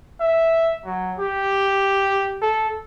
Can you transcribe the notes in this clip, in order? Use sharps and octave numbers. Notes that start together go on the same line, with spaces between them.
E5
F#3
G4
A4